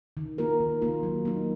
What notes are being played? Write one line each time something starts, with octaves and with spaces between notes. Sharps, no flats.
D#3
A#3 F4 A#4
D#3
A#3 F4 A#4
F#3
A#3 D#4